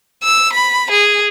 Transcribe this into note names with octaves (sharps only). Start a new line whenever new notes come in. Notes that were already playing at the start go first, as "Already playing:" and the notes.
E6
B5
G#4